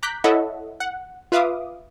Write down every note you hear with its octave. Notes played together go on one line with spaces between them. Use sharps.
A#5 D6 F#6 G6 B6
E4 A4 C#5 D#5 E5 F#5
F#5
F4 B4 E5 F5 D6 D#6